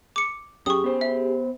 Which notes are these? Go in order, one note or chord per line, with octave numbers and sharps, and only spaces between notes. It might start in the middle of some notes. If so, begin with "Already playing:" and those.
D6 C#7
F#2 C#4 G4 G#4 C#6 D#6
B3 C5
E5